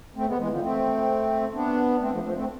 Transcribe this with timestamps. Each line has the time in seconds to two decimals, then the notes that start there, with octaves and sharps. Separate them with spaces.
0.15 A3 C4
0.27 G#3 B3
0.38 E3 G#3
0.49 D3 F3
0.61 A3 C4
1.54 B3 D4
2.00 A3 C4
2.12 F3 A3
2.23 F3 A3
2.35 A3 C4